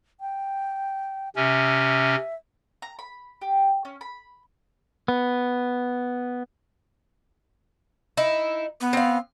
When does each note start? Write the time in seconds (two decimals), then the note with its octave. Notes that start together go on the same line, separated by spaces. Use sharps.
0.20 G5
1.36 C3 C#4 E5
2.82 A#5
2.99 B5
3.41 G4
3.85 C#4
4.01 B5
5.08 B3
8.17 D#4 E4
8.81 B3
8.93 C4 F5